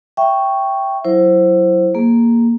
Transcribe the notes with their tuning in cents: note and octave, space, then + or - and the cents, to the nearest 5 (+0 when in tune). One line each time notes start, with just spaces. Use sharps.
E5 +10 G5 +0 C#6 +0
F#3 +0 E4 +15 C5 +10
A#3 +0 G#4 +0